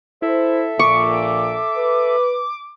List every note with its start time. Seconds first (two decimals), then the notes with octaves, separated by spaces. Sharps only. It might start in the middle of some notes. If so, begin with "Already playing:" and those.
0.22 E4 A4 C5 E5
0.79 A#1 A#2 C#6 D6
1.76 B4